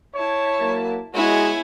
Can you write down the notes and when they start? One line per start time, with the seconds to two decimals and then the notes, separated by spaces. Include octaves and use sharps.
0.15 E4 C#5 A5
0.60 F#3 A#3
1.14 G#3 B3 E4 F#4 C#5 G#5